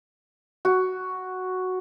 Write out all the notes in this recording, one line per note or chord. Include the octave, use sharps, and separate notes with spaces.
F#4